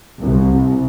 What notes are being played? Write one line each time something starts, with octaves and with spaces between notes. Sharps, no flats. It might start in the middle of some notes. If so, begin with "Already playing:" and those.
C2